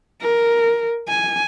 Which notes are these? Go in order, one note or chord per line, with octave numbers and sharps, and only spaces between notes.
A#4
G#5